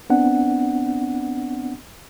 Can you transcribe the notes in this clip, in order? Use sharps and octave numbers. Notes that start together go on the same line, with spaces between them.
B3 C4 D4 F#5